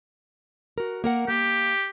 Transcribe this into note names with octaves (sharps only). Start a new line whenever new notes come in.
F#4 A#4
A#3 A#4 F#5
A#3 G4